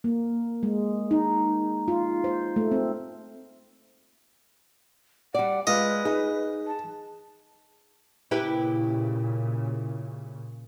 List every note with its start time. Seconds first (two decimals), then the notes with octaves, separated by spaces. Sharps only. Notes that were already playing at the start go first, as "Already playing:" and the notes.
0.04 A#3
0.63 G#3
1.11 D#4
1.88 F4
2.24 C5
2.56 A3
2.71 C4
5.34 G3 D5 F#5
5.67 G#3 F4 B4 D#5
6.05 D#4 G#4
6.67 A5
8.31 A#2 C#3 E4 G4 B4